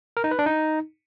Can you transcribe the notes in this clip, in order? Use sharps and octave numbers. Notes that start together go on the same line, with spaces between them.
A#4
D#4
B4
D4
D#4